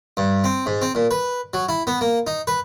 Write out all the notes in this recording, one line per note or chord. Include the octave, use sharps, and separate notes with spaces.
G2
C4
G#2
C4
A#2
B4
F#3
E4
B3
A#3
D#4
B4